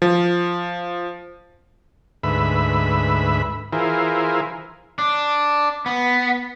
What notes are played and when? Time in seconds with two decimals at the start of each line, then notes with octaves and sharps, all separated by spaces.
0.02 F3
2.23 D2 G#2 B4 E5 B5
3.73 E3 E4 F4 G#4 A#4 C5
4.98 D4
5.86 B3